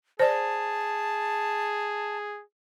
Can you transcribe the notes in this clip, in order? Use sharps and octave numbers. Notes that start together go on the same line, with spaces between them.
G#4 C5 D5 A5